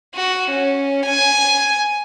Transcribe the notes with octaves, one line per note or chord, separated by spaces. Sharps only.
F#4
C#4
G#5